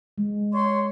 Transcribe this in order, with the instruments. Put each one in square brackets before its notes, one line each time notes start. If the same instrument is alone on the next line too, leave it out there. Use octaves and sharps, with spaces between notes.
[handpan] G#3
[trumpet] C#5 [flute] C6